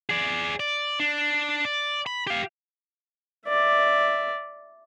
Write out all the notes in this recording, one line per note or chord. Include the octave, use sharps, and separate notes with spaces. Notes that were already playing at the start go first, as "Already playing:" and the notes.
G#4 D5
D5
D4
D5
B5
G4 F5
D5 E5